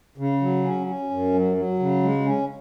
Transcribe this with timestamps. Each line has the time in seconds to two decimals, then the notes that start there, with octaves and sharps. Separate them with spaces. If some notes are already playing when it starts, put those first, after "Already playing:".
0.18 C#3
0.41 F#3
0.64 C#4
0.87 C#4
1.10 F#2
1.34 F#3
1.57 F#3
1.79 C#3
2.03 G#3
2.26 C#4